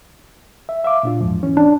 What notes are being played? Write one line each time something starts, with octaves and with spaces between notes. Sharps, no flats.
E5
E5 F5 D6
A#2 D4 F4
E2 G#2 F3
E3 C#4
D4